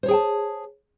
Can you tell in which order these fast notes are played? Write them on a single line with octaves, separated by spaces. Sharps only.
C5 C#5 G#4 G5 A5